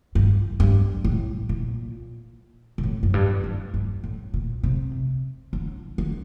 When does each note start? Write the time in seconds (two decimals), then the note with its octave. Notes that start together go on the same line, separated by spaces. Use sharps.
0.15 G2
0.60 G2
1.04 A2
1.49 A#2
2.78 A#2
2.83 A2
3.03 F#2
3.14 G2
3.44 F#2
3.74 G2
4.04 A2
4.34 A#2
4.63 C3
5.53 D3
5.98 D3